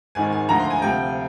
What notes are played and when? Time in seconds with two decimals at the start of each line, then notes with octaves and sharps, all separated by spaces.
0.15 G#1 G#2 D#3 G#5
0.33 G#5
0.48 D2 D3 F3 A#5
0.60 C6
0.70 G#5
0.82 D2 C3 F3 G5